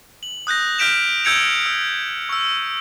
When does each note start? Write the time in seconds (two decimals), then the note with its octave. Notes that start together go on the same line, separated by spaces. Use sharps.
0.23 F#7
0.47 D#6 F#6 G6 A#6
0.78 F6 G6 B6 D7 E7 F7
1.25 E6 G6 G#6 C#7 D7 F7
1.66 E6
2.29 C#6 E6